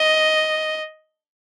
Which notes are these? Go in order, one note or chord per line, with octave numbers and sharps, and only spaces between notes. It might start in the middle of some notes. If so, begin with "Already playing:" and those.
Already playing: D#5